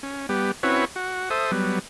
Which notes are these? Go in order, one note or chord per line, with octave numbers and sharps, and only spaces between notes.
C#4
G3 B3 G4
C4 C#4 E4 F#4 B4 C#5
F#4
A4 C5 E5 D#6
F#3 G3 B3